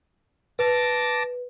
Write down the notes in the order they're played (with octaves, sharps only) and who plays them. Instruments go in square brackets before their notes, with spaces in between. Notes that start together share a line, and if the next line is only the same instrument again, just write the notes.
[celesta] B4 [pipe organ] A5 D6 A#6